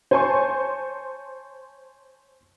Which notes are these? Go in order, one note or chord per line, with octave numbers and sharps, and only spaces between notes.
C5 C#5 G#5 A5 C6 C#6